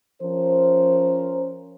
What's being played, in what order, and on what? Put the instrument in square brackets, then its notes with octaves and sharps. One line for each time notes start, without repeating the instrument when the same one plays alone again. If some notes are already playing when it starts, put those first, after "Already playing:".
[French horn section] F3 C#4 A#4 C5